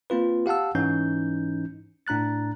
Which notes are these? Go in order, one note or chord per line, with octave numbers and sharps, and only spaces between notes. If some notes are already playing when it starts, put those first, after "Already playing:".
A#3 C4 F4 B4
G4 F5 F#5 A5 E6
G#2 E3 C#4 D#4 G6
A2 D4 A#5 F#6 A6